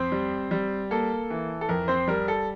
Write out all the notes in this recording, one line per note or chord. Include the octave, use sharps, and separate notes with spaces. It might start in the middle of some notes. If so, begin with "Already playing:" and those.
Already playing: F2 C4 C5
G3
G3
A#3 A4
E3
A4
F2 A#4
C4 C5
G3 A#4
A4